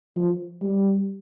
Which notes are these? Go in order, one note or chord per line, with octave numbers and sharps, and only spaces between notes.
F3
G3